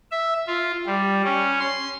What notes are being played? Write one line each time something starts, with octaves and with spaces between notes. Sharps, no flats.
E5
F4
G3
C#4
C6